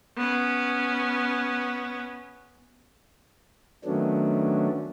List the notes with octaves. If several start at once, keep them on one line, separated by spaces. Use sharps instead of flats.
B3 C#4
D#3 F#3 A3 B3 C#4 D4